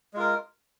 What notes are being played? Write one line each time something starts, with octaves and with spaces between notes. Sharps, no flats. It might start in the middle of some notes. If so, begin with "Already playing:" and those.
G#3 F4 A#4